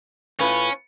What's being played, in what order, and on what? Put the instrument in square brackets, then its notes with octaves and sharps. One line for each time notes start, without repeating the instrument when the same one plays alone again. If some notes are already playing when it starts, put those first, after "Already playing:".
[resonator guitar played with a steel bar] A2 F4 B4 [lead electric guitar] C#4